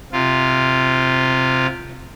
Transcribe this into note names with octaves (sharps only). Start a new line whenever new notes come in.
C3 F4